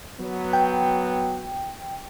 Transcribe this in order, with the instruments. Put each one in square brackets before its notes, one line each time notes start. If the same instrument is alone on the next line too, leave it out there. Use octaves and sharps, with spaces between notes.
[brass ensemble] F#3 B3
[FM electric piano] G5